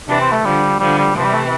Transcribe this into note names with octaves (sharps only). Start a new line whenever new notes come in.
C3 E3 D4
C4
A3
D3 F3 G3
D3 F3 G3
G3
C3 E3 F3
G3
A3